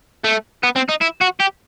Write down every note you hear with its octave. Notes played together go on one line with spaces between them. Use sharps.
A3
B3
C4
D#4
E4
F#4
G4